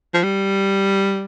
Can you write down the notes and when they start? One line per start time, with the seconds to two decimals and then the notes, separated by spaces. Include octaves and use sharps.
0.14 F3
0.23 G3